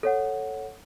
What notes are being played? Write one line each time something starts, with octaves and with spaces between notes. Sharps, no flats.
A4 C#5 F#5